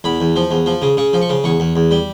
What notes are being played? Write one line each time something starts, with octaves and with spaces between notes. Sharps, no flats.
E2 B5
E2
F3
E2
F3
C#3
C#3 C#6
F3
C#6
C#3
E2 C#6
E2
E2
G3